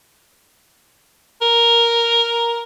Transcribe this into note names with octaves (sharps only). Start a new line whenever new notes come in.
A#4